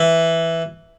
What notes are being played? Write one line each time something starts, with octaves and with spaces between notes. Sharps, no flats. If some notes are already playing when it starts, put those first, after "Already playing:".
Already playing: E3